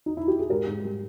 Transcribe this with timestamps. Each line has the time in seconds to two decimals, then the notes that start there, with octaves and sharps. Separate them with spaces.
0.06 D#4
0.17 E4
0.28 G4
0.40 G#4
0.49 G#2 G4 A#4
0.67 G#2
0.85 G3